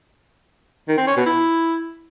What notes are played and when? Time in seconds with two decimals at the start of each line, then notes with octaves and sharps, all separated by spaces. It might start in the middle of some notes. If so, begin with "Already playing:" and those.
0.88 D#3
0.98 C4
1.07 C#4
1.16 B2
1.26 E4